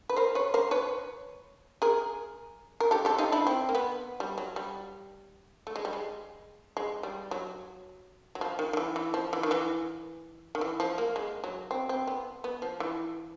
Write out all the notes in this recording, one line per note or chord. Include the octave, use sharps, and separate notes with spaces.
B4
A#4 C5
B4 C#5
A#4 C5
B4 C#5
G#4 A#4
A#4
G4 A4
G4 A4
D#4 F4
D4 E4
C4
A#3
B3
G3
F#3
G3
A3
G#3
G3
G#3
G#3
G3
F#3
F#3
F3
D#3
D#3
E3
E3
F3
E3
D#3
E3
D#3
E3
F3
A#3
G#3
F#3
C4
C4
B3
B3
F3
E3